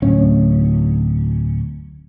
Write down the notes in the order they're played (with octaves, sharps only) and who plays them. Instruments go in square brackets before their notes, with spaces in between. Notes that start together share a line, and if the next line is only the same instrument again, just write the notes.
[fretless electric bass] D1 C#4